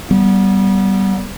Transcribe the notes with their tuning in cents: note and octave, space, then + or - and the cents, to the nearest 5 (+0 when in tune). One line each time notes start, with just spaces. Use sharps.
G3 -25 B3 -20